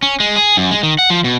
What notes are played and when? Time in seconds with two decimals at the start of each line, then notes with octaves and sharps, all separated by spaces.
0.03 C#4
0.20 G#3
0.36 G#4
0.57 F#2
0.71 G#3
0.83 D#3
0.99 F#5
1.10 F3
1.24 B2